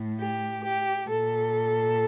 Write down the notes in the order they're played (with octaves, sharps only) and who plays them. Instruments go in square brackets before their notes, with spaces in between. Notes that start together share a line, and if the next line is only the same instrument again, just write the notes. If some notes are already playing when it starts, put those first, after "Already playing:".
Already playing: [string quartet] A2
G4
G4
A#2 A4